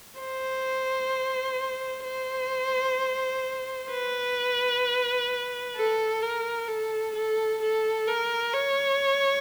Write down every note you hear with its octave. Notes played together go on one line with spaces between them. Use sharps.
C5
C5
B4
A4
A#4
A4
A4
A4
A#4
C#5